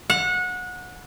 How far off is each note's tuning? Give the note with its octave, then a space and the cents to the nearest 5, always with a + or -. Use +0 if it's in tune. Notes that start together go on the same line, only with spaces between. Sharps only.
F#5 -25